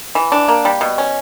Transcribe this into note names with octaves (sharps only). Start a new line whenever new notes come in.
E3
D4
A#3
G3
B2
C#4